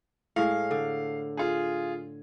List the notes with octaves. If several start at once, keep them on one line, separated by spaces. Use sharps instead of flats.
A2 G#3 F5
D3
F4 G#4